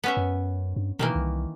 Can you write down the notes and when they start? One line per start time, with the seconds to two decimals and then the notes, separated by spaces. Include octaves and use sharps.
0.04 B3 C#4 E5
0.17 F#2
0.76 G2
0.99 B2 D#3 E3 A#3
1.15 C2